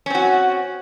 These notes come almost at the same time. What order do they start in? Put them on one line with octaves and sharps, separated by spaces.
C#4 C4 F#4